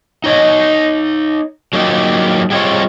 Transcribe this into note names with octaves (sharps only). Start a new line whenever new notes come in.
D#4 C#5 D#5
F#3 A#3 D#4 F4 G4
G3 G#3 C4 F4 C#5